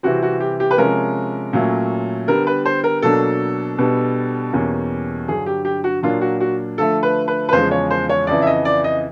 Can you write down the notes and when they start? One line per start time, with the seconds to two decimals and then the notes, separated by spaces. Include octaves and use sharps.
0.03 C3 E3 G3 C4 F#4
0.23 F#4
0.40 G4
0.60 G4
0.71 B4
0.78 C3 F3 G#3 C#4 A#4
1.53 A#2 F#3 A3 C#4
2.28 D3 G3 B3 A#4
2.47 B4
2.65 C5
2.84 A#4
3.02 B2 F#3 A#3 D4 A4
3.78 B2 G3 B3 D4
4.53 E2 B2 G3 A#3 C#4
5.28 G2 D3 F#3 G#4
5.46 G4
5.65 G4
5.84 F#4
6.03 A#2 F#3 A#3 D4 F4
6.21 F#4
6.41 F#4
6.78 D3 F3 A3 A4
7.03 B4
7.28 B4
7.49 B4
7.53 E2 C#3 F3 G#3 C5
7.71 C#5
7.91 C5
8.09 C#5
8.27 F2 C#3 E3 D5
8.42 E5
8.47 D#5
8.65 D5
8.84 D#5